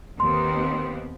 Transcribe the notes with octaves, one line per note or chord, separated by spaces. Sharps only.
D#2 B3 C4 C6